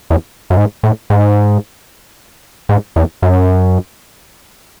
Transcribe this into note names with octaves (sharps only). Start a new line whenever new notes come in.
E2
F#2
G#2
A2
G#2
G#2
E2
F#2